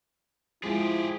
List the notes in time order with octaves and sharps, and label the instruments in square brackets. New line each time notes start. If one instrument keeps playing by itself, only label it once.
[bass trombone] F3 [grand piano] G#3 [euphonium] E4 [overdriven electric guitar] G4 G#4